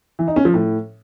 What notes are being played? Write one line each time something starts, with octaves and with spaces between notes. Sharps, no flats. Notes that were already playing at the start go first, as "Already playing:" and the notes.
E3
D#4
C#4
F3
A2